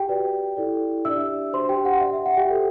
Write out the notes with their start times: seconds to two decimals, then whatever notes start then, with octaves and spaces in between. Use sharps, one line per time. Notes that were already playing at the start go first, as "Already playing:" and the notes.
Already playing: G4 G5
0.09 F#4 B4 D5
0.57 E4 A4 D5
1.05 D4 G4 D5 E5 E6
1.53 D4 F#4 C5 C6
1.69 G4 G5
1.85 F#5
2.01 G4 D5 E5
2.13 E5
2.26 F#5
2.37 G4 G5
2.49 F#4 A4 C5